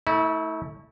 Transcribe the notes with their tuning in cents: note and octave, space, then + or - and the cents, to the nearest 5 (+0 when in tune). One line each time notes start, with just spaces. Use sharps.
A3 +10 E4 -35